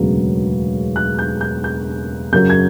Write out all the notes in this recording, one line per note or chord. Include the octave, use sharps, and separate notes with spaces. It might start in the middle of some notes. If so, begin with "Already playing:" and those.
Already playing: E1 D2 C#3 F#3 B3
F#6
G6
G6
G6
F#2 C#3 F#3 G6
G#6